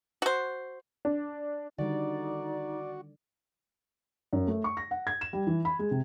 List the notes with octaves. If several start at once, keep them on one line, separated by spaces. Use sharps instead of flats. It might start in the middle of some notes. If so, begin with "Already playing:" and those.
F#4 C5
D4
D3 D#3 G3 D#4 F#4 D5
F#2
A3
C#6
A#6
F#5
G#6
E7
G3
E3
B5
G#3
C3